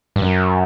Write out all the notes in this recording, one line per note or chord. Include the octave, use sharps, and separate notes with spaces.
G2
F#2